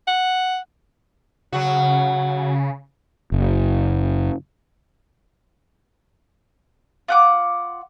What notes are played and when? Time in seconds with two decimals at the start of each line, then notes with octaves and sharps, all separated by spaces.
0.07 F#5
1.52 C#3 F#3 F#4
3.32 F#1
7.08 F4 F#5 D6